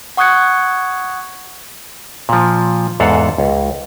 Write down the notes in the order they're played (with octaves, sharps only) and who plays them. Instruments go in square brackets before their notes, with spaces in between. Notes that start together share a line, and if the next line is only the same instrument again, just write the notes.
[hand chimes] F#5 C#6 D#6 F#6 G#6 C#7
[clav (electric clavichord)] A#2 F3
E2 G#2 A4 F5 F#5
C#2